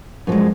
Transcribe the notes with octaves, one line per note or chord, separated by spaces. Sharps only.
F#2 F3 G#3